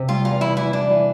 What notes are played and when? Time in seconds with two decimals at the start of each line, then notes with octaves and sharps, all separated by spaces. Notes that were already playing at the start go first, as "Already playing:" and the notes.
Already playing: C3
0.08 G3 F4
0.24 E2 F4
0.40 E3 E4
0.57 E3 E4
0.73 E3 D4
0.90 E3